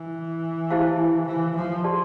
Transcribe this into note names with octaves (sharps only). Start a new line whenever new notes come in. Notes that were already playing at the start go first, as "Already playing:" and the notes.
Already playing: E3
E4 G4 C5 F5 A5
E3
F3
G4 D5 A5 C6